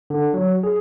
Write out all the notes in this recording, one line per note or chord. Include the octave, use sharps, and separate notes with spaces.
D3
F#3
G#4